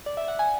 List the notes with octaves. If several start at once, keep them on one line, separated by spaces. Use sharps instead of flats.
D5
E5
F#5
G#5